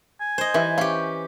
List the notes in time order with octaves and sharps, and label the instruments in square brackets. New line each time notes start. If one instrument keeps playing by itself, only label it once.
[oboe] G#5
[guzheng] C5 D#5
[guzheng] E3 [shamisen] G3 B4 E5
[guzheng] C#4 G4 [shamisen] F5